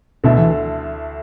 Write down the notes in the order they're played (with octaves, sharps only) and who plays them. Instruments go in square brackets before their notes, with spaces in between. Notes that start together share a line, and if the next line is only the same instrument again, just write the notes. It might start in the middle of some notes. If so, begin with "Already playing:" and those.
[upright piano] D2 D3 A3 E4 A4 [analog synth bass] B2
[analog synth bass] E3